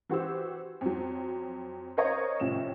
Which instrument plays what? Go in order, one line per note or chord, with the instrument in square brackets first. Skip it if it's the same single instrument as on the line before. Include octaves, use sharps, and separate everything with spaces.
[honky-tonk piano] E3 F#4 G4 C5 E6
F2 F#3
A#4 C5 C#5 D#5 A#5 C#6
C2 A2 F3 C#4 E7